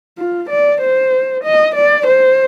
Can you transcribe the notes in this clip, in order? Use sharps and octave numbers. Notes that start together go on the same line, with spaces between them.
F4
D5
C5
D#5
D5
C5